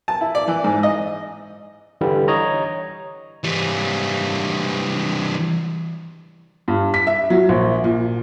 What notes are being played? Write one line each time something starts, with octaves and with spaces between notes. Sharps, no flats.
A5
E4
D5
E3
G#2
D#5
D3 E3 G3
C#5 D#5 A#5
E3 G3
G2
B6
E5
F#3
A#1
A#2